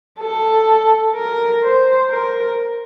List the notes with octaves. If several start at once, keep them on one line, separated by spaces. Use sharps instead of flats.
A4
A#4
C5
A#4